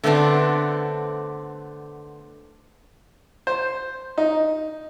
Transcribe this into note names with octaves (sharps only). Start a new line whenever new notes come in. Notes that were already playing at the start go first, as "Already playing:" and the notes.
D3 A3 B3 C4 D4
C5
D#4